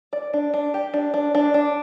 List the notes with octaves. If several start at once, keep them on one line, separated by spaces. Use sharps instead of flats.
D5
D4
D4
G4
D4
D4
D4
D4